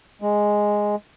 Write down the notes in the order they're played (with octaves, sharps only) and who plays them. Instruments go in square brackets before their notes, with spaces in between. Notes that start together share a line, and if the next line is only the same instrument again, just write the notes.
[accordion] G#3